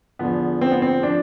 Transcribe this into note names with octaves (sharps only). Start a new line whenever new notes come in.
E2 D3 F3 B3
C4
B3
C4
F3 D4